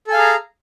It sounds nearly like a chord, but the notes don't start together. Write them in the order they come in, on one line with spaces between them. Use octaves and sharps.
A4 G#5 F5 G#4 A#5